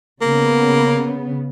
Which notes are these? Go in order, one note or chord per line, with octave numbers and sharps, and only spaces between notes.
C#3 A#3 B3